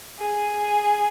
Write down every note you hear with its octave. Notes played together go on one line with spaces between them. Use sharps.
G#4